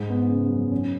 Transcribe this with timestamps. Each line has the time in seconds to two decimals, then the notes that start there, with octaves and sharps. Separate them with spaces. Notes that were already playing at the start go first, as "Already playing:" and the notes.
Already playing: G#2 G#3
0.09 B3
0.29 C#3
0.50 F#2
0.71 C#4